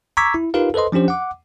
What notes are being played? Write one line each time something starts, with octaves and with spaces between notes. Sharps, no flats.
A#5 C#6 D6 E6 G#6 B6
E4
D#4 F4 G4 A#4 B4 F5
A4 B4 C5 D#5 C6
F3 C#4 D4 G4 C5
F#5 D6